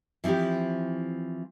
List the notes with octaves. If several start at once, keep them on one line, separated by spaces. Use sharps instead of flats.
E3 F3 C4 E4 G4